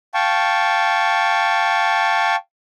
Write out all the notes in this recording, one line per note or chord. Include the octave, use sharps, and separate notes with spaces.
F5 G5 A5 C#6